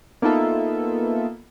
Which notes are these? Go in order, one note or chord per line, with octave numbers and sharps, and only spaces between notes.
A#3 B3 D#4 F4 A4 E5